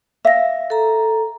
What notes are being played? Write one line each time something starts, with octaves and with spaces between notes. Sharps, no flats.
E5 F5 A#6
A4 A#5